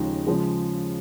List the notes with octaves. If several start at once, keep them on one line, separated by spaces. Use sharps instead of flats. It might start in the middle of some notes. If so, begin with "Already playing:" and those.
Already playing: D#2 C#3 F3 G#3 D#4
C#3 F3 G#3